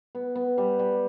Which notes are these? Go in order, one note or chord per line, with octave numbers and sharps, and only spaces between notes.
B3
B3
G3
G3